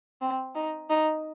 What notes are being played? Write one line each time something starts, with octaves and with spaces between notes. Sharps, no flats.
C4
D#4
D#4